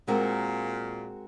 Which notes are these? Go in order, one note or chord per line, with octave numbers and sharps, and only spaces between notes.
A#2 G#3 C4 F#4 A#4